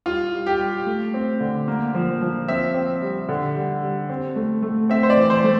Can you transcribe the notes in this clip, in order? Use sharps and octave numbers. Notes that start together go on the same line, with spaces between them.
G3 F4
G3
G4
G3
A3
C4
D3
A#3
F3
F3
C4 E5
C4
G3
D3
G3
G3
C4
A3
A3
C4 E5
C5
D5
E3
C5
A3